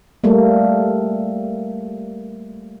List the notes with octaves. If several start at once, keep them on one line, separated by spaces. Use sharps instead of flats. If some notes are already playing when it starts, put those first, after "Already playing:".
G3 A3 A#3